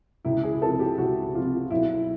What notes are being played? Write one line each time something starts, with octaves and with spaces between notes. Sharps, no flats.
C#2 E4
G#4
C3 F3 A4
G4
C#2 F#4
C3 F3 F4
B1 E4